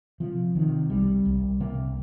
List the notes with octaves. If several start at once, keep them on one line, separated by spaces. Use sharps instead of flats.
C3 F3
C3 D#3
C2 G3
C2
C3 A#3